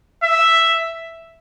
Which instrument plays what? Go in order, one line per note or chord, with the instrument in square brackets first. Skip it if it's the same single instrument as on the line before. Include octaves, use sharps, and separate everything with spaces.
[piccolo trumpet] E5